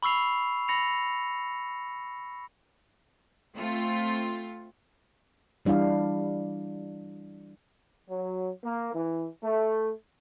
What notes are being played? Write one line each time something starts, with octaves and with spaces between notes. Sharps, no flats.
B5 C#6 E6 C7 F7
B5 A#6 C#7 F7
A3 C4 F4
E3 G3 D4 E4 F5
F#3
A#3
E3
A3